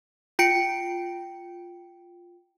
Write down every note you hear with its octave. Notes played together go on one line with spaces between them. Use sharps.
F4 G5 C#7 D7